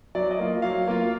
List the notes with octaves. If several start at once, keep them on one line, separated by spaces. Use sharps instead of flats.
F#3 D5
D#5
A#3 F4
F#3 F5
A#3 F4